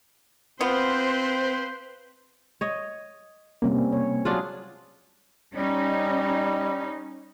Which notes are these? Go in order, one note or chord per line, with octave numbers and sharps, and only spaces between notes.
B3 C4 F4 B4 C5
C#5 D#5
C3 G3 A#3 C4 C#4
C#5
F#3 D4 F4 G#4
G3 C#4 D#4